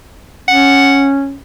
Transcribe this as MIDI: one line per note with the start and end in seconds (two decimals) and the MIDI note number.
0.48 1.37 61
0.48 1.09 78